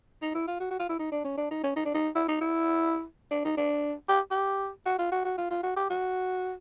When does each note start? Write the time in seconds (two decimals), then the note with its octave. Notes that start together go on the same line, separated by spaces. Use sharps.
0.22 D#4
0.35 E4
0.47 F4
0.60 F#4
0.71 F#4
0.79 F4
0.89 E4
0.99 D#4
1.12 D4
1.25 C#4
1.38 D4
1.51 D#4
1.64 C#4
1.76 D#4
1.85 D4
1.94 D#4
2.15 E4
2.29 D#4
2.41 E4
3.31 D4
3.45 D#4
3.57 D4
4.09 G4
4.31 G4
4.86 F#4
4.99 F4
5.12 F#4
5.25 F#4
5.38 F4
5.51 F4
5.63 F#4
5.76 G4
5.90 F#4